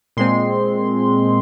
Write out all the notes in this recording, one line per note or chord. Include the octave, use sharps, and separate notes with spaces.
A#2 G#3 C4 C6